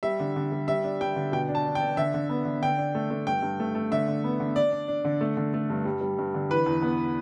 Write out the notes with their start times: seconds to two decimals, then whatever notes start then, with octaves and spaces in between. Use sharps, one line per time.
0.03 G3 E5
0.20 D3
0.36 D3
0.52 G3
0.68 G3 E5
0.84 D4
1.00 G3 G5
1.16 D3
1.32 B2 G5
1.49 D4
1.55 A5
1.66 D4
1.75 G5
1.81 D4
1.97 D3 E5
2.14 D3
2.29 B3
2.45 D3
2.62 D3 G5
2.78 D4
2.95 A3
3.10 A3
3.26 G2 G5
3.42 G2
3.60 A3
3.75 A3
3.91 D3 E5
4.08 D3
4.24 B3
4.40 D3
4.56 D4 D5
4.72 D4
4.88 D4
5.05 D3
5.21 A3
5.37 D3
5.54 A3
5.70 G2
5.85 G3
6.01 G3
6.18 G2
6.34 D3
6.50 E3 B4
6.66 E2
6.82 B3